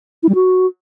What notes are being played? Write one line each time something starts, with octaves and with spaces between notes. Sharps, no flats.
E4
G3
F#4